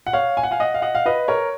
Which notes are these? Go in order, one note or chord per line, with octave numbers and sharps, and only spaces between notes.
F#5
C#5 F5
G#5
F#5
F5 G#5
D#5 F#5
F5
D#5 F#5
F5
B4 D#5
A#4 C#5